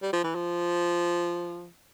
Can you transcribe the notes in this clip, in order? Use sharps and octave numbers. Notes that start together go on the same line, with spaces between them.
G3
F3
E3
F3